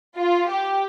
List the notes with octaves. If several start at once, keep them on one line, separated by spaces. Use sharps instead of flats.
F4
G4